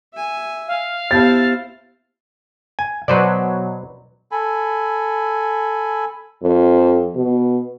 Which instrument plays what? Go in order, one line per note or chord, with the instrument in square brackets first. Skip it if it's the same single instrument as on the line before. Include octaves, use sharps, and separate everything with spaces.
[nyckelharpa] E5 G#5
[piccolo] F5
[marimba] B3 G4 A5 [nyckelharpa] E4 C5 [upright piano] A6
[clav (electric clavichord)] G#5
[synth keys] B2 F#3 [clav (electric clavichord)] B4 C5 D5
[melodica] A4 G#5 B5
[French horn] F2
B2